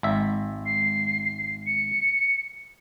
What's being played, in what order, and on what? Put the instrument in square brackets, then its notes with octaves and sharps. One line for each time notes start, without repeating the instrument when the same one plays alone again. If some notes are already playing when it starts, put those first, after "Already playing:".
[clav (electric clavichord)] G#1 E5
[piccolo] C7
C#7